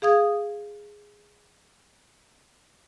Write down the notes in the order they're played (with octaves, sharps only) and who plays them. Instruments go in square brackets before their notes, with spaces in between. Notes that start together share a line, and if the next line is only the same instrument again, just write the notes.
[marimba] G#4 F5 D#6 G#6